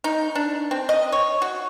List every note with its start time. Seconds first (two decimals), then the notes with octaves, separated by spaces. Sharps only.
0.04 D#4
0.35 D4
0.71 C4
0.89 D#5
1.12 C#5
1.42 F#4